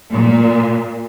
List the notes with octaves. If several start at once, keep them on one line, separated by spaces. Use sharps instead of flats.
A#2